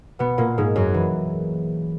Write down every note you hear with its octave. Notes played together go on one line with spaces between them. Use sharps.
B2 B3
A#2 A#3
G#2 G#3
F#2 F#3
E3